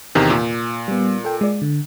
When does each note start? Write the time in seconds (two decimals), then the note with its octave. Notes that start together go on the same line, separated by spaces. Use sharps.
0.15 E2 C3 D#3
0.30 A#2
0.88 G3 B3
1.25 A4 G5
1.41 G#3 D5
1.62 D3